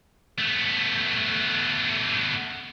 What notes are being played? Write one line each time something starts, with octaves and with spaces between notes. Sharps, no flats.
A3 B3